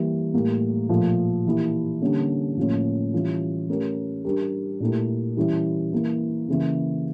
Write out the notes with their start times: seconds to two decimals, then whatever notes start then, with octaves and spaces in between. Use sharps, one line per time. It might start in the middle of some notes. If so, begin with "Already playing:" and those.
Already playing: E3 G3 A#3
0.33 A2 G3 A#3
0.89 A#2 F3 A3
1.45 E3 A#3 E4 G4
2.02 D3 G3 A#3 C#4
2.57 A2 F3 A#3 C#4
3.13 E3 G3 C#4 F4
3.69 A3 C#4 G4 A#4
4.24 G3 D4 G4 A#4
4.80 A#2 A3 E4 G4 A#4
5.37 E3 G3 C#4 E4
5.93 E3 A#3 E4
6.49 C#3 E3 A#3